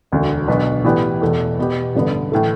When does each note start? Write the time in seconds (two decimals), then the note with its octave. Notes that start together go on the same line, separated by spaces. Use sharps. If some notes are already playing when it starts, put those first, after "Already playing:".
0.12 E1 D2 D3
0.48 B1 B2 B3 D4 B4
0.84 A2 E3 B3 G4 D5
1.22 E2 B2 A3
1.58 B2 B3 G4
1.95 A1 G2 D3 B3
2.32 A2 E3 A3